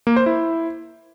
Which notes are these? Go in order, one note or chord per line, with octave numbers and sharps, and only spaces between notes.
A#3
C5
E4